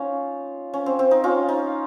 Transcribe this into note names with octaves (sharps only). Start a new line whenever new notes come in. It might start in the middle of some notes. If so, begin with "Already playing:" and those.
Already playing: A#3 C#4 D#4 F4
C#4
C4
C4
D#4
C#4 F4
D#4